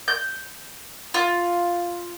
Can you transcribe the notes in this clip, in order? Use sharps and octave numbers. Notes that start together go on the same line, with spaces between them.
G6
F4